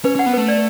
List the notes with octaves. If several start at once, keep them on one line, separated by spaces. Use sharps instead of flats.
C#4 B4
C#4 F#5
B3
A3 B4
D5